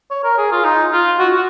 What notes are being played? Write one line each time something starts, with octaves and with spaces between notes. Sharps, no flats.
C#5
A#4
G#4
F4
D#4
F4
F#4
F#4